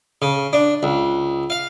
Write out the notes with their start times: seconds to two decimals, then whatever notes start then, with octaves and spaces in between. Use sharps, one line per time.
0.22 C#3
0.53 D4
0.83 C#2
1.50 F5